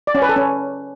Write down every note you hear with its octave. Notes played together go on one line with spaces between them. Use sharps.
D5
C#4
B4
A4
C#4